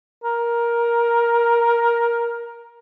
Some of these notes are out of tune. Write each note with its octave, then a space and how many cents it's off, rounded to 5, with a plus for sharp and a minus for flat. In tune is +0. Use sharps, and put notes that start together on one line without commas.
A#4 +10